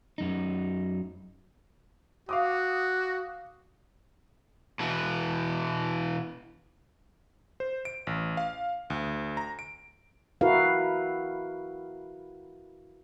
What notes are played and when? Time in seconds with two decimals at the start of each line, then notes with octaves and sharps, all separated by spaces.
0.18 F#2 D#4
2.29 F#4 F5 D6 D#6
4.80 B2 E3
7.60 C5
7.85 D7
8.07 A1
8.37 F5
8.90 D2
9.37 A#5
9.59 D7
10.41 E4 F#4 A#4 B4 F5